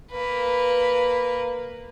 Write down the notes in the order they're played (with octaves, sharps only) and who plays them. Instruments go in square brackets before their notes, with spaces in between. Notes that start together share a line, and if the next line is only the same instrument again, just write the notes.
[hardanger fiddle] A#3 B4